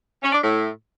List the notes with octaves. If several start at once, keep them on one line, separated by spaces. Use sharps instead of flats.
C#4
D4
A2